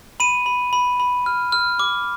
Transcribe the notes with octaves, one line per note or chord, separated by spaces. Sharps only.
B5 D#7
B5
B5
B5
F6
F6
D6